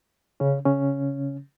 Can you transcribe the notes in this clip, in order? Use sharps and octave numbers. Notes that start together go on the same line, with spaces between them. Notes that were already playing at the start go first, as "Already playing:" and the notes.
C#3 C#4
C#3 C#4